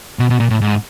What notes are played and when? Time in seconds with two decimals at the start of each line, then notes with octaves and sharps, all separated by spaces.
0.19 B2
0.30 B2
0.40 A#2
0.50 A2
0.61 G#2